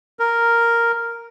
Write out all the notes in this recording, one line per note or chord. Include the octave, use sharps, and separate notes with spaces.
A#4